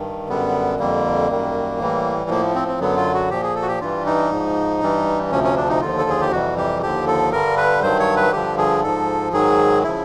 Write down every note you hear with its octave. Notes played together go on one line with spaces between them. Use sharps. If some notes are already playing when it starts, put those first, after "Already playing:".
Already playing: G2 D#3
F#2 D3 G3 B3
F2 D3 G3 A#3
F#2 D#3 G3
A2 E3 G3
A2 F3 A#3
C4
C4
F#2 D3 F#3 B3
F4
F#4
A#2 F3 G4
G#4
A4
F#4
G4
G2 E3 G3 F4
D#4
G#2 F3
G2 E3 G3
D2 C3 F3 C#4
C#4
D4
D#4
D#2 D3 F3 F4
A4
G#4
G4
F2 C3 E3 G3 F#4
G4
D#2 D3 F3 G4
A4
G2 D3 G3 A#4
B4
G2 D#3 F#3 C5
C#5
B4
G2 D3 F3 G4
G#4
G#2 F3 A4
G#2 D#3 F#3 G#4
C#3 F3 E4